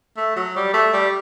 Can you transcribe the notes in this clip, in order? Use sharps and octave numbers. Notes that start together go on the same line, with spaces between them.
A3
F#3
G3
A3
G3